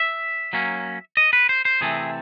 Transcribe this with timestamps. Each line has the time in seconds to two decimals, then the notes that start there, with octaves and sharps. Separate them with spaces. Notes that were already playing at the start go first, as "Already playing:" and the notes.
Already playing: E5
0.53 F#3 A#3 C#4
1.17 D#5
1.33 B4
1.49 C5
1.65 C5
1.81 C3 E3 A3 C4 G#4